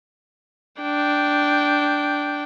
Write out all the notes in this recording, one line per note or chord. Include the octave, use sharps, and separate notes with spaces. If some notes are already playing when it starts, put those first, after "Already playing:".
D4 G5